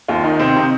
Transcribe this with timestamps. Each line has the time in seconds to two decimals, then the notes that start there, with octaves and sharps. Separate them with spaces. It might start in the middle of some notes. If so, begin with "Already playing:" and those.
0.08 D#2 F4
0.24 D#3 D#4
0.39 C3 C4
0.56 C3 D#4